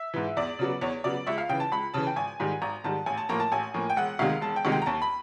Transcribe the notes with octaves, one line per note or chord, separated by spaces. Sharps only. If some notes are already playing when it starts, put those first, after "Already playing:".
Already playing: E5
G#2 E3
E2 D5
C#3 F#3 B3
E2 C#5
C#3 F#3 B3 D5
C#2 E5
F5
C#3 E3 G5
A5
C#2 B5
C#3 E3 A5
G5
G#1 G#5
G#2 D#3 G3
G#1 A#5
G#2 D#3 G3 A5
A1 G#5
A5
A2 F3 A#3 A#5
A5
A1 G#5
A2 F3 A#3
G5
E1 F#5
D2 C3 D#3 G#3 F5
E1 A5
G5
D2 C3 D#3 G#3
G5
A#5
D#2 A5
B5